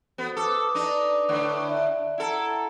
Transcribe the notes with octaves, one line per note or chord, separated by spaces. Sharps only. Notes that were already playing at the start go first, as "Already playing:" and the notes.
B3 F#4 A4 C5
A4 B4 D6 D#6
D4 D#4
A2 D3
D5 E5
E4 A4 F#5 A#5